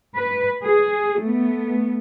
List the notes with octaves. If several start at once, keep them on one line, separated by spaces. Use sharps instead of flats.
B4
G#4
A3 B3